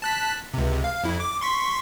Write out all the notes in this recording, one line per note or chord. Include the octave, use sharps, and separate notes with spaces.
A5 F#6 B6
C#2 C3
F5
F2 E4
D6
C6 C#6 B6